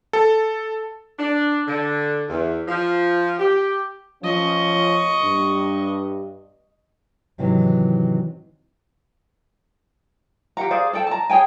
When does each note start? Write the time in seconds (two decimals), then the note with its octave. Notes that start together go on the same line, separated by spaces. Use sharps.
0.13 A4
1.18 D4
1.67 D3
2.28 E2
2.68 F3
3.39 G4
4.24 F3 C#4 D#5 C#6
5.24 G2
7.38 G#2 C3 D#3 E3 F#3
10.57 G4 F5 F#5 A#5
10.71 G#4 C5 D5 F5
10.93 A4 D5 G5 A5
11.07 A5 A#5
11.30 G#4 C#5 G5 G#5